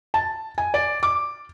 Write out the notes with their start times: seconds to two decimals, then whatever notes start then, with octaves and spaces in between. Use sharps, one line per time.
0.14 A5
0.58 G#5
0.74 D5
1.03 D6